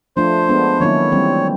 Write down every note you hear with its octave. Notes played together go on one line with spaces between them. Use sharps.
F3 A3 D4 F4 C5
G#3 B3 D4
D#3 F#3 A#3 C#4 E4 C#5
E3 G3 C4